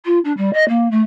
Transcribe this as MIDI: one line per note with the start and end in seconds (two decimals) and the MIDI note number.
0.05 0.18 65
0.24 0.32 62
0.37 0.53 55
0.53 0.66 75
0.68 0.90 58
0.91 1.00 57